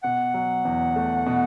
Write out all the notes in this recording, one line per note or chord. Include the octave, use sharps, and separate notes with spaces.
B2 F#5
F#3
E2
A3
B2